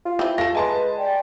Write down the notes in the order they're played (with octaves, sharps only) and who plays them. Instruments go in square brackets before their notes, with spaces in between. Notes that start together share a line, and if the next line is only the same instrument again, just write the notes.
[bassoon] F4
[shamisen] C4 F4 [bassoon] E4
[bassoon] A3 [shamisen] F4 A4 [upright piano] A#6
[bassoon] G#3 [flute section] B4 [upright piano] G#5 A5 C6
[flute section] D5 G5